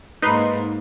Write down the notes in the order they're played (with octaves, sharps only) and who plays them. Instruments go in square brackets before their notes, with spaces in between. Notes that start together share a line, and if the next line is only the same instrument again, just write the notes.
[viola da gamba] G#2 A#3 [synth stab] D#4 B4 C6